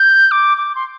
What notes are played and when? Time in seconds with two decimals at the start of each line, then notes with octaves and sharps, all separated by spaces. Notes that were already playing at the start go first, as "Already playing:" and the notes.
Already playing: G6
0.31 D6
0.57 D6
0.75 C6